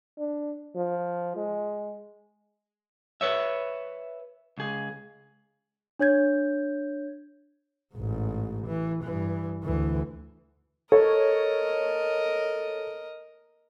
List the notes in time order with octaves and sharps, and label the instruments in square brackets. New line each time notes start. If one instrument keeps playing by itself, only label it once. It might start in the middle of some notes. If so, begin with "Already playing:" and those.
[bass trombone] D4
F3
G#3
[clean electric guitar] B4 C#5 E5
C#2 G#4
[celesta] D4 C#5 G6 G#6
[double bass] A1 G#2
E3
G2 E3
D2 E3
[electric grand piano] A4 [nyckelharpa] A#4 D#5 [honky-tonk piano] C#5